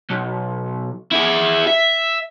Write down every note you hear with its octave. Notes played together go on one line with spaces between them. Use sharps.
B1
E4 G#4
E5